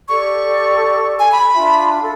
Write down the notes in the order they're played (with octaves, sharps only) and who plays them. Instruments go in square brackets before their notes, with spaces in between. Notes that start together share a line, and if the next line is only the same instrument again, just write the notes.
[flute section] G4 A4 D5 [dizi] C#6
[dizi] G#5
B5
[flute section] D4 F4 E5
A4